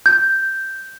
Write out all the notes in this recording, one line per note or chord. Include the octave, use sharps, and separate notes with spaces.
G6